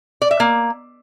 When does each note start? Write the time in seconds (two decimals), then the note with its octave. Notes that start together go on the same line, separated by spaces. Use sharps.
0.22 D5
0.31 E5
0.40 A#3